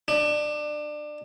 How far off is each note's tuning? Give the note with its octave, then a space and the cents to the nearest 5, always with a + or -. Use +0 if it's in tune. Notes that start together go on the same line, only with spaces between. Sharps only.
D4 +25